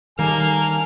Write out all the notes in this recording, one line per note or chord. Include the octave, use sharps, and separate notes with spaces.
D#3 G3 A#3 A4 G#5 F6